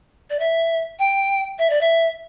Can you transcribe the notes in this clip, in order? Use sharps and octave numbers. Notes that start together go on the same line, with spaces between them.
D5
E5
G5
E5
D5
E5